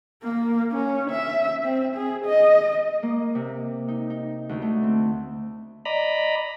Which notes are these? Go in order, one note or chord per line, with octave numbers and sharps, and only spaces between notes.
A#3
C#4
E5
C4
G#4
D#5
A#3
C3
D#4
D#4
D2
A3
C4
D5 D#5 A#5 B5